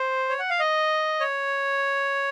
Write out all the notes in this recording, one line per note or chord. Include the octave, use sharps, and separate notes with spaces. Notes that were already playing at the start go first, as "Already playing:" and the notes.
Already playing: C5
C#5
F#5
F5
D#5
C#5